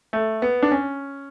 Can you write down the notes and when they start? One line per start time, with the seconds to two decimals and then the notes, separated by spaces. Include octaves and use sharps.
0.13 A3
0.42 B3
0.62 D4
0.72 C#4